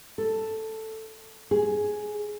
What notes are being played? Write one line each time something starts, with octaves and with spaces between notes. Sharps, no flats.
A4
G#4